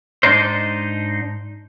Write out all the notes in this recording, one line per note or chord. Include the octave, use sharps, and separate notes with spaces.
G#2 B2 D4 D#4 C5